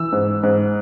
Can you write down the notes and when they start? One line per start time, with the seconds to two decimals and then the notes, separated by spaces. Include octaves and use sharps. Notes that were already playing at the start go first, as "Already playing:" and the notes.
Already playing: E3 E6
0.12 G#2
0.43 G#2